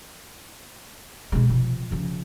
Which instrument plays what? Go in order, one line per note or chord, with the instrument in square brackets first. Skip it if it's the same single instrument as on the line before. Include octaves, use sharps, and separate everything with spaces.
[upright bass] B2 G#3
C3 F3
C#3 F3